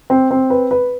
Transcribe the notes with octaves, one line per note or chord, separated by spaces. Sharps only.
C4
C4
B4
B4